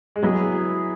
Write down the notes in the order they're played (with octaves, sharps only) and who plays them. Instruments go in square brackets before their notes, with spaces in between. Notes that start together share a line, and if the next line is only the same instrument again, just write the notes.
[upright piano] G#3
[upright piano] F#3 [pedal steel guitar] B3 E4 G#4